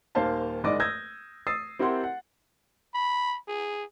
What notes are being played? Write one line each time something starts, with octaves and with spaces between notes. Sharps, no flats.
D#1 D#2 A#3 C5 F5 A5
F#1 G#2 G#3 D5 D#5 D6
D#6 E6 G6 G#6 A#6
D#6 E6 A6 C7
C4 E4 G4 A#4 F#5 C6
F#5
B5
G#4